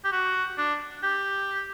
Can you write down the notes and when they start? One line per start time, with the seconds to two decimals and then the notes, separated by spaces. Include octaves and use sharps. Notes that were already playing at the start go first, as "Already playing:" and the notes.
0.04 G4
0.12 F#4
0.58 D4
1.03 G4